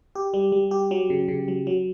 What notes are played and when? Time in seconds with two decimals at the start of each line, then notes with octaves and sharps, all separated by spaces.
0.15 G4
0.34 G3
0.52 G3
0.71 G4
0.91 F#3
1.10 C#3
1.28 C#3
1.48 F#3
1.67 F#3